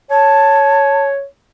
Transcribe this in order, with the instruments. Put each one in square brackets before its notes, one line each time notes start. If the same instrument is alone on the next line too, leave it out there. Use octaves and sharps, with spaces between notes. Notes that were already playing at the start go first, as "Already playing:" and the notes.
[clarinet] C#5 [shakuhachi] A5